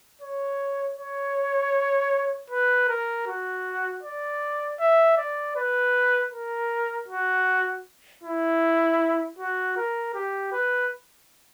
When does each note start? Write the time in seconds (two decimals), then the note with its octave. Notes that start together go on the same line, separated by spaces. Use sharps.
0.21 C#5
0.98 C#5
2.50 B4
2.89 A#4
3.27 F#4
4.03 D5
4.80 E5
5.18 D5
5.56 B4
6.32 A#4
7.08 F#4
8.23 E4
9.39 F#4
9.77 A#4
10.14 G4
10.52 B4